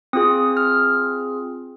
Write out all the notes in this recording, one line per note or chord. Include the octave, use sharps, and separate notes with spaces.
C4 F4 G#4 D#6
F6